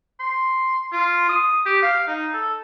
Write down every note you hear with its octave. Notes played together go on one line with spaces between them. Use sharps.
C6
F4
D#6
G4
F5
D#4
A4